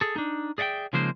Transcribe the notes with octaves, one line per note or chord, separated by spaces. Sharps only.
G#4 A4
D4 D#4
G#4 D5 E5 F#5 G5
C#3 F3 G#3 A#3 D#4 C5